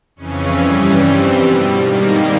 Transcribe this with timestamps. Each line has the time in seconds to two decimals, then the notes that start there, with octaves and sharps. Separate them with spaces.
0.16 F2 C#3 E3 C#4
0.56 G2 E3 G3 C#4
0.95 G2 E3 G3 C4
1.35 B2 G3
1.74 G#2 D#3 G3 A#3